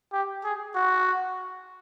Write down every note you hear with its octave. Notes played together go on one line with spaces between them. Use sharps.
G4
G#4
F#4